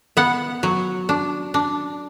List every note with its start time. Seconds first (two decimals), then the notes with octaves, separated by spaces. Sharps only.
0.17 B3 F#5
0.63 F#3
1.09 D4
1.54 D4